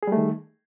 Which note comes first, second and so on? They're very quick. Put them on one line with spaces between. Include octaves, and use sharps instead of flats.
G#4 G3 A3 D#3